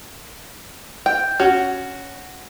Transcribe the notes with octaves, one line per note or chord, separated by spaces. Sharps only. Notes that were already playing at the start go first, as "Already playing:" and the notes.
G5
C#4 F#4